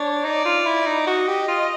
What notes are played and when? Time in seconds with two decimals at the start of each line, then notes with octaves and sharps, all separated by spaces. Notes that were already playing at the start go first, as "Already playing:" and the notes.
Already playing: D4 C#5
0.24 D#4 D5
0.45 F4
0.66 E4
0.86 D#4
1.07 F#4 D#5
1.28 G4
1.48 F4